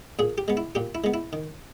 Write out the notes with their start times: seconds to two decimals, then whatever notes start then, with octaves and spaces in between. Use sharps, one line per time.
0.19 A#2 G#4
0.38 G4
0.48 G#3 B3
0.57 E4
0.75 A#2 G4
0.95 E4
1.04 G#3 B3
1.14 E4
1.33 D#3